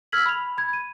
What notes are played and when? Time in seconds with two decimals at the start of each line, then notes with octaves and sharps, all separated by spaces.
0.12 E6 F6 G#6 B6 F#7
0.26 B5 F7
0.58 B5 G#6
0.73 D#7